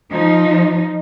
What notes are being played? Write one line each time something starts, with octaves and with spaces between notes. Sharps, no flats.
F3 D#4